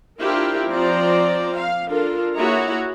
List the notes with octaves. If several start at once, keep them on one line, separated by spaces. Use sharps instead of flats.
D4 E4 F4 G4 A#4 C5
F3 C4 C5 D5 A#5
F5
D4 F4 A4 A#4
A#3 E4 F#4 G#4 C#5 A#5